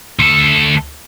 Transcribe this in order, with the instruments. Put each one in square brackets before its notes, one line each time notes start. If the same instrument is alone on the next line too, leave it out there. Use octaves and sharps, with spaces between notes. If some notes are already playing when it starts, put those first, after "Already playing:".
[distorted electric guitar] D2 A4